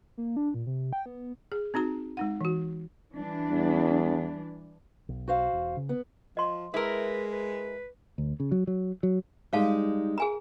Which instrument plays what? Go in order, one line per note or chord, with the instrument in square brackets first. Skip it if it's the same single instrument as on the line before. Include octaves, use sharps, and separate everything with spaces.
[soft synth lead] A#3
D4
A#2
C3
G5
B3
[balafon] G#4
C4 D#4 F#4 A#5
G#3 D#4 F#5
E3 F#4
[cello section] E3 G3 D4
[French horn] E2
[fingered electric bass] B1
[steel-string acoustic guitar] F#4 C5 F5
[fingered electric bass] E1
C#3
[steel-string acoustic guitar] B3
[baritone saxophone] F3 [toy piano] D#5 C6
[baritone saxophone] G#3 [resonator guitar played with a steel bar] E4 A#4 [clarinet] B4
[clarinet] B4
[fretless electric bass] D2
C#3
F#3
F#3
F#3
[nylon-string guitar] G3 G#3 [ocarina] D#4 [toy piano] C#5 F5 A5
[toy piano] G#4 G#5 A#5